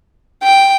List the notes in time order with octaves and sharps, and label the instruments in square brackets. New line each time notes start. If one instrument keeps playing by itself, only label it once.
[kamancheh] G5